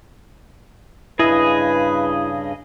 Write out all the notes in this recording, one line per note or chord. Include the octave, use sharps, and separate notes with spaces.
G2 C#3 E4 G#4 B4 D#5